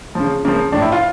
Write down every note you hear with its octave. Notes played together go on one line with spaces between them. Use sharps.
C#3 F3
C#3 F3 A#3
A2 F3 D4
E4
F4